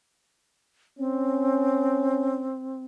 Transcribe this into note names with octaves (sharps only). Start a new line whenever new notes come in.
C4 C#4